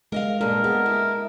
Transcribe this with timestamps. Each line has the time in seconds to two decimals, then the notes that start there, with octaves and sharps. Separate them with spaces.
0.12 G#3 A#4 D#5 F5
0.41 G2 A#2 A4 A#4
0.64 B3 G#4
0.86 E4